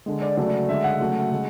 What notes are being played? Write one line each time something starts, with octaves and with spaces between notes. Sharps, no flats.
D3 G#3
D5
C#3 F#3 A3 D5
D3 G#3 E5
F#5
C#3 F#3 A3
C#3 G#3